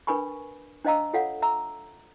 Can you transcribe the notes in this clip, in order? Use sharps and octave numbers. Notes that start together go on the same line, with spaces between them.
D4 A#4 B4 G#5 B5 C#6
D4 C5 D#5 F5 A#5 E6
F4 A4 C#5 F5 F#5
E5 A#5 E6